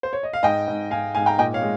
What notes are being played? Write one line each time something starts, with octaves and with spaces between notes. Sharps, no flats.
C5
C#5
D#5
F5
G#2 D#5 G5
G#2
G#2 F5 G#5
G#2 F5 G#5
G5 A#5
A#2 D#5 G5
C#5 F5
G#3